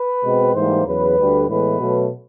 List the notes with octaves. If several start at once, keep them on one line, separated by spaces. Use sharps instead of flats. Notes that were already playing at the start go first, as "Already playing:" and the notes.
Already playing: B4
B2 G#3 C4
G#2 E3 G3 A#3 C5
E2 C#3 F#3 B4
D2 D3 G3
A2 E3 G#3 B3 B4
B2 F#3 A3